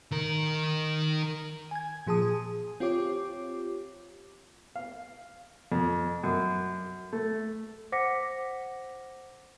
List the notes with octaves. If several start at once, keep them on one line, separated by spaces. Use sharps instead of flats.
D#3 A#4
G#5 G#6
A#2 F3 G#4 A5 D#6
G#4
C4 F4 G4 C#5 D6
F5
F2
F#2
A3
C5 F#5 D6 A#6 B6 C#7